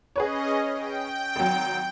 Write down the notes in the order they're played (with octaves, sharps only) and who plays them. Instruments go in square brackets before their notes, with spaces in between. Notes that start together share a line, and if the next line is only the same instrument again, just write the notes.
[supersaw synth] C#4 D#5 [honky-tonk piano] G#4 B4 C#5
[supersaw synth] G5
[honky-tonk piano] G#1 F#3